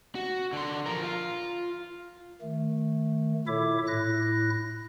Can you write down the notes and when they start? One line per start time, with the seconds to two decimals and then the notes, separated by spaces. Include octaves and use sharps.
0.15 F#4
0.53 D3 C6
0.86 F3 A#4
1.03 F4
2.41 D#3 A3
3.47 A#2 E4 A4 C#5 E5 D6
3.87 A2 E4 F#6 A#6